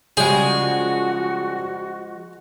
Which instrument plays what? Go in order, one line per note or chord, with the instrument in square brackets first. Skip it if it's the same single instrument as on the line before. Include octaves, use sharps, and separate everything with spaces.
[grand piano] C#3 G3 C#4 [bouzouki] F3 G#3 [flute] F#4 [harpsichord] G#4